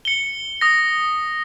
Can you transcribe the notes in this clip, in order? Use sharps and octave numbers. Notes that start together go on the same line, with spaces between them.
C#7 G7
D#6 A#6